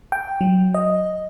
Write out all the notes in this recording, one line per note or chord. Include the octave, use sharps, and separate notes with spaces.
G5
F#3
D#5